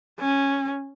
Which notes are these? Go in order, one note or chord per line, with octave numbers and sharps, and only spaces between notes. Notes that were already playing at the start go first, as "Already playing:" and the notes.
C#4